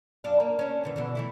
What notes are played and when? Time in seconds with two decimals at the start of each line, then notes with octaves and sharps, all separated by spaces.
0.24 F#2 D4 F5
0.40 A#3
0.59 C#4 D4
0.83 G2 D3 E3
0.96 B2 D3 E3
1.15 E3 A3 E4